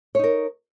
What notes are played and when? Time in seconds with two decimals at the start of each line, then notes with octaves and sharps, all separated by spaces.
0.15 C#5
0.19 D#4
0.24 A#4